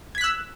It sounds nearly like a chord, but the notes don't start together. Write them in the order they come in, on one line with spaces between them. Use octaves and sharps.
G#6 B6 F#6 E6